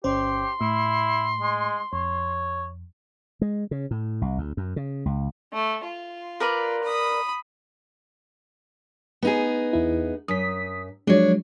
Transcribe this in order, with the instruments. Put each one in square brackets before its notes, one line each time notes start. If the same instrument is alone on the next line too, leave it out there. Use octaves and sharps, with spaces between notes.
[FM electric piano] G1 C#4 C5 [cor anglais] G4 [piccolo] C6
[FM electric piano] A2 [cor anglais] E4
[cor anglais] G#3
[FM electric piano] F2 [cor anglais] C#5
[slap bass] G#3
C#3
A2
C2
D2
F#2
C#3
C#2
[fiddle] A3
F4
[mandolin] A#4 B4 D5
[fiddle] B5 D#6
[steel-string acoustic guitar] B3 D#4 G#4
[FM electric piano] E2 E4
[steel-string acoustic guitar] F#2 [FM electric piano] D#6 B6
[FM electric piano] F3 F#3 G#3 [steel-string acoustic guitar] D4 C#5